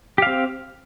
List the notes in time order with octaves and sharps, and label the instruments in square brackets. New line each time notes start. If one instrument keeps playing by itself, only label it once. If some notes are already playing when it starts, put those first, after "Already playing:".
[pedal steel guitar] G4
F5
C4